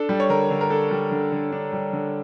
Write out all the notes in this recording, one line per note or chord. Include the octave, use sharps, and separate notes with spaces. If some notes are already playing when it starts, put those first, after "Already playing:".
Already playing: D4 A4
G3
C#5
D3 A#4
D3
A#4
D4 A4
G3
D3
D3
D4
G3
D3